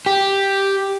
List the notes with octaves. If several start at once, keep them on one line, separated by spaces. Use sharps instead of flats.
G4